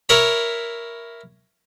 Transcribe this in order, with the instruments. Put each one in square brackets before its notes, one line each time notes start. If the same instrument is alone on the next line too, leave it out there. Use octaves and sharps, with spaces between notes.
[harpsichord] E4 A#4 C#5 B5